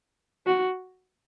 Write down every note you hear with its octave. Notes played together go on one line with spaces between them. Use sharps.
F#4